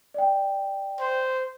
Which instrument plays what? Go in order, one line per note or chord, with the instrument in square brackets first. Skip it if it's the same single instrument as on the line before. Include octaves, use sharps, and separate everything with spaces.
[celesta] D5 G5
[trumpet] C5